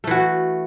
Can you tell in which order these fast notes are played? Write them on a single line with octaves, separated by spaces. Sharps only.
A3 E3 F#4